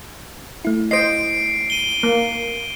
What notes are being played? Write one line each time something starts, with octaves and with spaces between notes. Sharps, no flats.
A3 E4
C5 D#5 C7 D7
D#7 G7
A#3